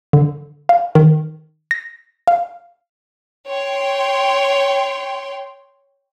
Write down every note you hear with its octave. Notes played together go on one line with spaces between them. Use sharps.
D3
F5
D#3
A#6
F5
C#5 G5 C6